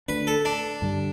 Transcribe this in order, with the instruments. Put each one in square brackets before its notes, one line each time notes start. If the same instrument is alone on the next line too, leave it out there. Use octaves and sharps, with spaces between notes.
[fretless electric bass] D2 D3 A3 D4 [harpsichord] B4
[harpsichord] A4
D4
[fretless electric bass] G2 D3 G3